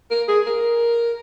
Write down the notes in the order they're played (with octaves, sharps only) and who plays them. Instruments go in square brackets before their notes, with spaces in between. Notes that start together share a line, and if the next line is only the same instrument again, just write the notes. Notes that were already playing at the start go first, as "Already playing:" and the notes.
[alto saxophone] A#4
G#4
A#4